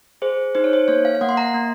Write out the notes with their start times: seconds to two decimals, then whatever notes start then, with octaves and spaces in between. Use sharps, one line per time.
0.22 G#4 C5
0.55 D#4 C5
0.64 C#5
0.73 C5
0.88 A#3 C#5
1.05 F5
1.15 F5
1.21 A#3 F#5
1.29 C6
1.37 A#5
1.54 A#3